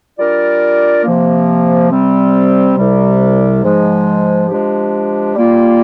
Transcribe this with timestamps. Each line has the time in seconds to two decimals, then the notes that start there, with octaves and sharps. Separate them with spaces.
0.18 G3 D4 F4 A#4 D5
1.04 C3 F3 A#3
1.90 C3 G3 C4
2.76 C2 C3 G3
3.63 G#2 F3 G#3
4.48 F3 G#3 D4 G4
5.35 G3 A#3 F4